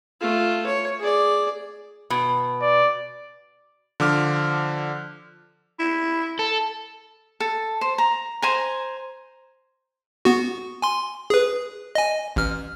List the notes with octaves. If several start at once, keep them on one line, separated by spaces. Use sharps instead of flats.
A3 F4
C#5
G#4 D5
B2
D5
D3 F3 D6 F6
E4
A4
A4
C5
A#5
C5 G#5 A#5
B3 F#4
G#5 C6
G#4 B4
D#5 G#5
A1 F6